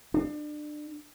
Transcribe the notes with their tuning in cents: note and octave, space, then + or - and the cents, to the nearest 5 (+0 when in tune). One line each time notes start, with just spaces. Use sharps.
D4 +30